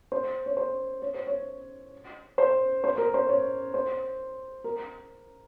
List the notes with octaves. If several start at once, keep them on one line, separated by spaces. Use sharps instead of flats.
C5
C#5
C5
C#5
C5
C#5
C5
C5
A#4
C5
C#5
C5
A#4